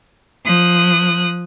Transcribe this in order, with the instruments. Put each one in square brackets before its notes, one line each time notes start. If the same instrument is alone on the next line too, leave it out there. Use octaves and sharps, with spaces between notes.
[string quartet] F3 D#6 F#6